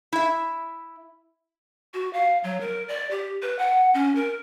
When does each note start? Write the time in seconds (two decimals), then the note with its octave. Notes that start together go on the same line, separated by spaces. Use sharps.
0.12 E4 E5
1.94 F#4
2.13 F5
2.44 F#3
2.60 A#4
2.88 D5
3.11 G4
3.42 B4
3.59 F#5
3.94 C#4
4.15 A#4